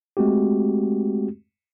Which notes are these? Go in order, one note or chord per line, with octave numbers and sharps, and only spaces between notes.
G#3 A3 C4 F#4 G4